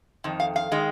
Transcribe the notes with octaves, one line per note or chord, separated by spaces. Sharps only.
F2 D#3
F5
F5
D#3 G#3